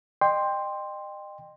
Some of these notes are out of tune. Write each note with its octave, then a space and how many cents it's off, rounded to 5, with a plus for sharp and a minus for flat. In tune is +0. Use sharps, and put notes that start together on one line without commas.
D#5 -35 G5 +15 C6 +0